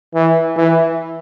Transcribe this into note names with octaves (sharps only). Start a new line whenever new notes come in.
E3
E3